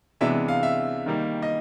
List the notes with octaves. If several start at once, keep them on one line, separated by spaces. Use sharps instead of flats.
C3 E3 G#3 B3 D4 E5
F5
E5
D#3 G3 A#3 D#4
D#5